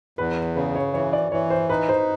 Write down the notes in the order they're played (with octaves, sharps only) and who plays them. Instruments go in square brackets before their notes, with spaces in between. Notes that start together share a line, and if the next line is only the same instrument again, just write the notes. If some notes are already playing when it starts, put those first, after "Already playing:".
[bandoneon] E2 [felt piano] B4
[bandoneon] C#3 [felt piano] B4
[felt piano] C#5
[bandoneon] E3 [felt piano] C#5
[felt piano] D5
[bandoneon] E3 [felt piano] C#5
[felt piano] C5
[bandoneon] D#4 [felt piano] B4
[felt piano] C5